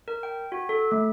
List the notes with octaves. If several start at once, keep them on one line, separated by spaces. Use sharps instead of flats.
A#4
G5
F#4
A4
A3